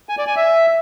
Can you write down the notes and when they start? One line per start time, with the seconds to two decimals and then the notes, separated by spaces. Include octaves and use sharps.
0.09 G#5
0.18 D5
0.27 G#5
0.36 E5